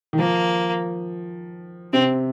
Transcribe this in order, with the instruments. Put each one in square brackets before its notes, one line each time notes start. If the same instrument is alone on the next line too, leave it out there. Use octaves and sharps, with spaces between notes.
[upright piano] D#3
[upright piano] F3 [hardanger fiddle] A#3
[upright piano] C3 [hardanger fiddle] C4